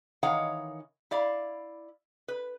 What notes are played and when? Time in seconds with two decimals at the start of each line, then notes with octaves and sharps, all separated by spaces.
0.23 D#3 E3 D#4 C#5 F5 F#5
1.11 E4 D5 F5
2.28 B4